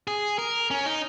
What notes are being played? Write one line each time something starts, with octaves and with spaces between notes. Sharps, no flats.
G#4
A#4
C#4
D#4